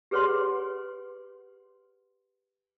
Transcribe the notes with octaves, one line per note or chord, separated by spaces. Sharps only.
G4 G#4 B4 C#5 F#5 C6